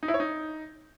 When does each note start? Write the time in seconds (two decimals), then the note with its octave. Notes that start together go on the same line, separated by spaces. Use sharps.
0.03 D#4
0.08 E4
0.14 C#5
0.20 D#4